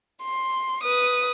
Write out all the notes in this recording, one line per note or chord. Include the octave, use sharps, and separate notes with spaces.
C6
B4 D#6